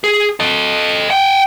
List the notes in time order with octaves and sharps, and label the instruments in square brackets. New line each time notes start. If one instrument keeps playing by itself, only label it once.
[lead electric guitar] G#4
A4 D#5
F#5 G5